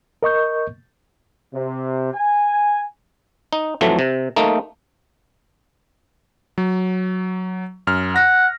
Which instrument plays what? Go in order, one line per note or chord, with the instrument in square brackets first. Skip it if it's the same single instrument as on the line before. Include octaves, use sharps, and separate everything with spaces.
[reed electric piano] A#4 D#5 C#6 G6
[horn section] C3
G#5
[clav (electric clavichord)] D#4
F2 E3 F#3 A3
C3
A3 A#3 D#4
[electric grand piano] F#3
F#2 F6
[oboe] F#5 [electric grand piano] A#6